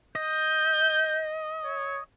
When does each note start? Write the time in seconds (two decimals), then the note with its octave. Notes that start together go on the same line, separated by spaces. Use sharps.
0.16 D#5 G6
1.64 C#5